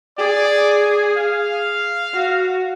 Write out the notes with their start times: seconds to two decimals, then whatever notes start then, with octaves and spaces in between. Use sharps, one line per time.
0.18 G#4 D5
1.17 F5
2.14 F#4